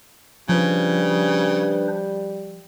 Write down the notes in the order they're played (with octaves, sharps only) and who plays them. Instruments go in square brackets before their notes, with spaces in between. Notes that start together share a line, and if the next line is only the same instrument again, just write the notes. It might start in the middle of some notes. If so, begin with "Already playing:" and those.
[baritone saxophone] C#3 [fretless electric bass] F3 [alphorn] G3 [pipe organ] D4 B4 C5